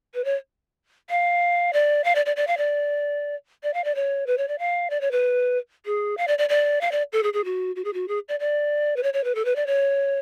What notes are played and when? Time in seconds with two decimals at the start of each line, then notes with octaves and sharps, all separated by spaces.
0.14 B4
0.24 C#5
1.10 F5
1.73 D5
2.04 F5
2.15 D5
2.26 D5
2.36 D5
2.47 F5
2.57 D5
3.63 D5
3.74 F5
3.84 D5
3.95 C#5
4.27 B4
4.38 C#5
4.48 D5
4.59 F5
4.90 D5
5.01 C#5
5.11 B4
5.86 G#4
6.17 F5
6.27 D5
6.38 D5
6.49 D5
6.81 F5
6.92 D5
7.13 A4
7.23 G#4
7.33 G#4
7.44 F#4
7.76 F#4
7.84 G#4
7.93 F#4
8.08 G#4
8.29 D5
8.40 D5
8.96 B4
9.03 C#5
9.13 C#5
9.24 B4
9.35 A4
9.45 B4
9.56 D5
9.67 C#5